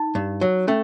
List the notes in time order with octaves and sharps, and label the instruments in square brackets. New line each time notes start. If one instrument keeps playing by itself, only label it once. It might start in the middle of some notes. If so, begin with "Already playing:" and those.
Already playing: [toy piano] D#4
[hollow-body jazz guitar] G2
F#3
[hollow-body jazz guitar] A3 [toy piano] C#4